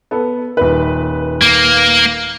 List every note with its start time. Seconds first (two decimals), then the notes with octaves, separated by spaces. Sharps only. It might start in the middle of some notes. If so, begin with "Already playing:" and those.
0.11 B3 A4
0.57 D#1 B4
1.42 A#3